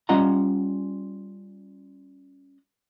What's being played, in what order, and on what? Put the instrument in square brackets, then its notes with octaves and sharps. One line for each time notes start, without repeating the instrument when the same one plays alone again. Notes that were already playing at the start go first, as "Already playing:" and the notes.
[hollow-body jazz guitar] G3 C#4 F4 D#5 F#5 A#5